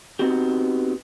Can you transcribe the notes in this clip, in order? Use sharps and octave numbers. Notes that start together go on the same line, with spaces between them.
B3 C4 D#4 F#4 G4